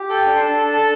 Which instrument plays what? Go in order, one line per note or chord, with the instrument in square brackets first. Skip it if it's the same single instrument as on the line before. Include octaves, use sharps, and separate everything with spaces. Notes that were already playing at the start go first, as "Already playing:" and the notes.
Already playing: [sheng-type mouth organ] G4
A4 G5
D4
C6
D4 A5
A4
A4